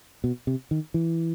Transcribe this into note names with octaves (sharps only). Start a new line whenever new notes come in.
B2
C3
D#3
E3